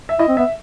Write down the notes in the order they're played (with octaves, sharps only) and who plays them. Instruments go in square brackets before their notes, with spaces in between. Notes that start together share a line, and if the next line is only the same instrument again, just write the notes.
[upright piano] E5
[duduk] E4 [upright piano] D#5
[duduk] C4
[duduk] B3 [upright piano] E5